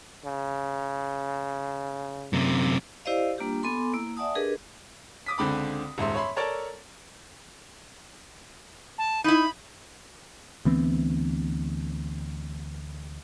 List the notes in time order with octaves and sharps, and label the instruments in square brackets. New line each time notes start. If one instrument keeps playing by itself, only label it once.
[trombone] C#3
[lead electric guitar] F#2 C3
[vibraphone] E4 G4 C5 D5 D#5 F5
G3 A#3 D4 F4 G4
B3 A4 G#5 C6 D6
A#3 E4 E6
D5 E5 F#5 G#5 A5 D#6
D4 G4 G#4 A#4 B4 D#5
[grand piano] D6 D#6 B6
C#2 D3 C4 B5 D6
D#1 G#2 E5 C6
C#5 E5 B5 C6
A4 A#4 C#5 D5 A5 A#5
[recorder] A5
[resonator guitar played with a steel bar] D#4 E4 [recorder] B5
[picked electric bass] D2 E3 B3 C4